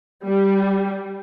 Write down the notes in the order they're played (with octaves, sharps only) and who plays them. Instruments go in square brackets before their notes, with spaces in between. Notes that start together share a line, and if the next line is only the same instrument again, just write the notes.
[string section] G3